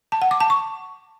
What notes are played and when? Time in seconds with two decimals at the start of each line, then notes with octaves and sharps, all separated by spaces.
0.12 A5
0.22 F#5
0.31 D6
0.40 A5
0.50 C#6